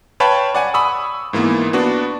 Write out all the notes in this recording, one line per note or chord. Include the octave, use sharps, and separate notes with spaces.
B4 C#5 F5 G5 A5 B5
D5 F#5 G#5
B5 C#6 D#6 E6
G#2 E3 A#3 B3
B3 D4 F#4 D5